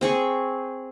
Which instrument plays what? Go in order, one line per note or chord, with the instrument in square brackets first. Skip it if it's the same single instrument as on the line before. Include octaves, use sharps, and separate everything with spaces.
[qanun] C4 G#4 C#6